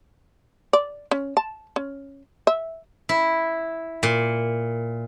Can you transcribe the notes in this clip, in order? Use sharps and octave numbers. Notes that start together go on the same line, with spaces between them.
D5
C#4
A5
C#4
E5
E4
A#2